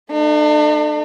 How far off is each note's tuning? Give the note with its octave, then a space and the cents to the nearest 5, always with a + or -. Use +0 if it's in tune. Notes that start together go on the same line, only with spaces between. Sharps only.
A3 +0 D4 +45